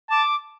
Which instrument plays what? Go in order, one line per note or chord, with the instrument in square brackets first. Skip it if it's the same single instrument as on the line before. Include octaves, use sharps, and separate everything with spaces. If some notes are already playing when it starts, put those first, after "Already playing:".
[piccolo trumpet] A5 [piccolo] D6